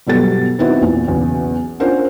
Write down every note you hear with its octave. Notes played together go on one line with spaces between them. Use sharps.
G1 B2 F#3 G3 A4 A6
D#3 B3 C4 E4 F#4 B4
A#1 E2 A#2 E3
B1 E2 C#3
C#4 D4 F4 A#4 C5 F#5